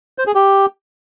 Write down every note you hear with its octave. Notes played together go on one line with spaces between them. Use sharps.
C5
G#4
G4